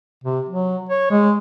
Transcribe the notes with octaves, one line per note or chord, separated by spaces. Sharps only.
C3
F#3
C#5
G#3